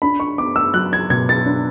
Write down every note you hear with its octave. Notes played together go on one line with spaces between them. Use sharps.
D4 B5
C#6
B3 D6
E6
F#3 F#6
G#6
B2 G#6
A6
D4